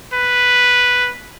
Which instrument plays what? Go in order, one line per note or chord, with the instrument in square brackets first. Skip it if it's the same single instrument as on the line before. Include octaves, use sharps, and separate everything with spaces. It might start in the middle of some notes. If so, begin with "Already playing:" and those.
[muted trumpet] B4